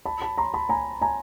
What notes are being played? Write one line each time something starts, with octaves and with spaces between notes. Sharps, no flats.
A5 B5
A5 B5
A#5 C6
A5 B5
G#5 A#5
G#5 A#5